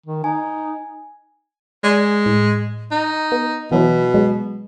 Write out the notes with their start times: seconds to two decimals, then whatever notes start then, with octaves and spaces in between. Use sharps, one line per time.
0.06 D#3
0.24 D#4 G#5
1.84 G#3 D5 G#5
2.26 A2
2.92 D#4
3.32 B3
3.71 B2 E3 F#3 E4
4.14 F#3 G#3